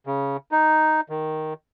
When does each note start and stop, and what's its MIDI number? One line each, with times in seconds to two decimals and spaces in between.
0.07 0.37 49
0.51 1.01 63
1.09 1.53 51